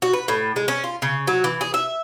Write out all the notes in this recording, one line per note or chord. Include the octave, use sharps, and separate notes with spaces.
F#4
B4
A2
G#3
C#4
F4
C#3
F#3
E3
G#4
E5